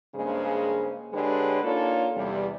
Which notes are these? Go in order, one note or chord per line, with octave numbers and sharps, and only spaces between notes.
G2 C#3 G#3 A#3 G#4 C5
D3 G#3 G4 B4 C#5
A#3 D4 D#4 F4 A4 C#5
E2 C3 G3